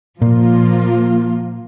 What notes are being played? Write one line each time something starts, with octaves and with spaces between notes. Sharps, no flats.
A#2 F3 A#3 F4